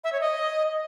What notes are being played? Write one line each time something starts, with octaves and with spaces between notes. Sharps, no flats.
E5
C#5
D#5